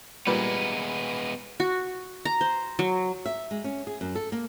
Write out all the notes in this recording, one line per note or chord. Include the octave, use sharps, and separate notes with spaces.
A#2 G3 G#3 A#3 B3 B4
F#4
A#5
C5
F#3
E5
G#3
C#4
G#4
F#2
A4
A#3